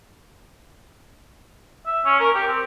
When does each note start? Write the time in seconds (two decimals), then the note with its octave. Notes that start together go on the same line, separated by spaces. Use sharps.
1.86 E5
2.06 C#4
2.20 A#4
2.35 G4
2.47 C4